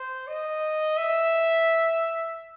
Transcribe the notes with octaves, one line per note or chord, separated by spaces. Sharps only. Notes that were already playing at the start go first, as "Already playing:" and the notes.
Already playing: C5
D#5
E5